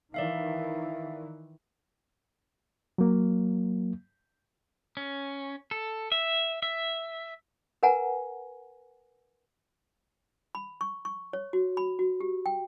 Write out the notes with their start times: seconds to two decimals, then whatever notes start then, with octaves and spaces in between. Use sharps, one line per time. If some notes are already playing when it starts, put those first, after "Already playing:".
0.14 D#3 E3 D5 E5 F5
2.98 F#3 A#3
4.97 C#4
5.71 A4
6.12 E5
6.62 E5
7.83 A#4 B4 F#5 G#5 A#5
10.55 B5
10.81 C#6
11.05 C#6
11.33 C#5
11.53 F#4
11.77 B5
11.99 F#4
12.21 G4
12.46 G5